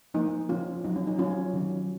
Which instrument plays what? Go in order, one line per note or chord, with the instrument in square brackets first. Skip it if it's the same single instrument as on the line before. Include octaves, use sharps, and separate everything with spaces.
[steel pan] F3 A#3 C#4 D#4
F3 A#3 C#4 F4
F#3 C#4 D#4
C#4
D#4
F#3 C#4 F4
D#3 F#3 C#4